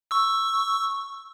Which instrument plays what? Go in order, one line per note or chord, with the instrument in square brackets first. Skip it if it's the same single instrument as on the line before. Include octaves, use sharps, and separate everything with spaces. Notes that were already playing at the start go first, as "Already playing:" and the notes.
[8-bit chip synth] C#6 E6